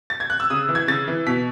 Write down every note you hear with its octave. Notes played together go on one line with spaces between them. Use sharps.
A6
G#6
F#6
E6
C#3 D#6
E3
G#6
C#3 A6
E3
B2 B6